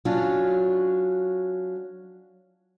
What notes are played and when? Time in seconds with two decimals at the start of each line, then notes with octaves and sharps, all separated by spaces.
0.05 F#3 C#4 D4 F4